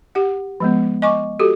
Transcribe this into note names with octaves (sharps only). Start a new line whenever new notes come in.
G4 F#5
F3 G#3 B3
D#5 G#5 C#6 D6
F#4 G4 A4